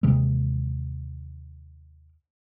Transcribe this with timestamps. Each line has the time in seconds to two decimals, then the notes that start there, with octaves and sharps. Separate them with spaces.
0.03 D#2 C3 E3 G#3